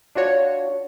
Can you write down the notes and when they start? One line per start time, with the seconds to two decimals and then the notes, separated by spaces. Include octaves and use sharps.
0.15 D4 F4 F#4 C#5